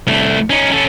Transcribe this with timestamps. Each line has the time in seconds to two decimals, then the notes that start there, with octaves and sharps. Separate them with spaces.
0.07 C2 A3
0.50 C#4 D#4
0.72 C#4 A4